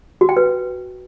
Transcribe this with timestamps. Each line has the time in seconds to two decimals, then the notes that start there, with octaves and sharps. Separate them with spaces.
0.21 F#4
0.29 G5
0.37 B4